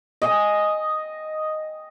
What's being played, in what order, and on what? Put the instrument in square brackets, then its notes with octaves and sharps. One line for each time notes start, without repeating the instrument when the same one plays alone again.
[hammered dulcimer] D#5 G5 G#5